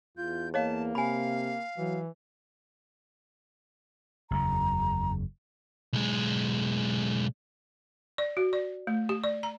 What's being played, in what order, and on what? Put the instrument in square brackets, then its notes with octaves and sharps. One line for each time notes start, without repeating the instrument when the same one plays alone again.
[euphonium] E2 [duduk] F4 [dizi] G6
[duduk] A#3 [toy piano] C#5 D#5 F5 [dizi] A5
[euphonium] C3 [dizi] F5 [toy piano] G#5 B5
[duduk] E3 [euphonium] F#3
[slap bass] F#1 E2 C#3 [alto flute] A#5
[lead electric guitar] B1 G#3
[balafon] D5
F#4
D5
A3
G4
D5
A#5